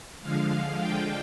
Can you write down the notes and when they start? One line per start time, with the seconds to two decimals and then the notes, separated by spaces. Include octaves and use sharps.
0.21 D3 F3 G#3 F5
0.80 D3 G#3 D4 F4 G5